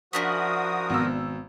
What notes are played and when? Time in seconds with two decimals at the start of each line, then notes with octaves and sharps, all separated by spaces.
0.13 F3 C#4 D4 E4 F#4 A#4 D#6
0.90 G#1 B2 E6